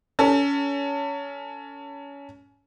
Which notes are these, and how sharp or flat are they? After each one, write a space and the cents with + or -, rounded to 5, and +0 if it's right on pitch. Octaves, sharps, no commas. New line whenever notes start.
C#4 +25 A4 +35